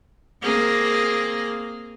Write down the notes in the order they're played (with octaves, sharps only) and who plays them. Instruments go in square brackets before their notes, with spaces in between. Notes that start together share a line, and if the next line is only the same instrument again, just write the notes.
[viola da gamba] A#3 C4 G#4